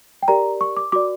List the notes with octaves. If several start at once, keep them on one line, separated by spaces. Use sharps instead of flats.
G5
G4 A#4 D5 A#5
C#6
D6
F#4 A#4 D5 D6